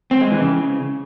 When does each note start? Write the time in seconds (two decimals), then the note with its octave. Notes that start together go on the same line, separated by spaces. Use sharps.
0.11 C4
0.21 G#3
0.31 E3
0.41 C#3